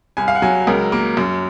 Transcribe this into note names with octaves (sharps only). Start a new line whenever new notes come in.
C2 G#5
F5
F#5
F#3 G#5
C#2 A#4
A#3
F#2